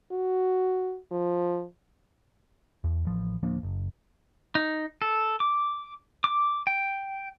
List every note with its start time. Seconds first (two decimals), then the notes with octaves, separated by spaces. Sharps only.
0.11 F#4
1.12 F3
2.84 E2
3.05 A1 F3
3.43 D1 F3 A#3 D4
3.63 F#1
4.55 D#4
5.02 A4
5.40 D6
6.24 D6
6.67 G5